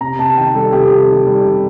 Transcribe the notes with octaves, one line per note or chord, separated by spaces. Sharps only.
C3 A#5
C3 A5
D#3 G5
G3 A4
C3 G4
C3
D#3
G3
C3